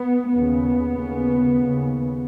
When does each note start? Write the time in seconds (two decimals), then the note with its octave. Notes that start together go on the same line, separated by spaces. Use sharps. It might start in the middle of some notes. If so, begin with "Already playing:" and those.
Already playing: B3
0.31 D#2 C#3 B3
0.94 D#2 C#3
1.57 D#2 C#3